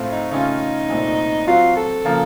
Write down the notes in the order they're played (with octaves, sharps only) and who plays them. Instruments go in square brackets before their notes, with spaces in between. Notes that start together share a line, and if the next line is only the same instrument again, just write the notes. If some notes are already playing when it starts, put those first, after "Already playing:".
Already playing: [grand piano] A2 A3 C4 F4
[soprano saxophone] D#4
[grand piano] C#3 A3 C#4 F4 [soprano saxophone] D#4
[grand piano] C2 A#2 A3 C4
[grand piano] C3 F#3 C4 F#4 [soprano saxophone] F4
[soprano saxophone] A4
[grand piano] C#3 F3 A#3